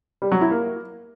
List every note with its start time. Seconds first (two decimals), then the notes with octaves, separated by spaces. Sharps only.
0.22 G3
0.32 F#3
0.41 E4
0.51 A#3